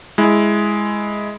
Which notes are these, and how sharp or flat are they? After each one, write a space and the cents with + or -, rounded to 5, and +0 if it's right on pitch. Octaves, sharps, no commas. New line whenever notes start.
G#3 +0 E4 +0